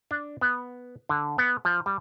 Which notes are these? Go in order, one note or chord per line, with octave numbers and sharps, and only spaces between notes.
D4
B3
D3
B3
F3
G3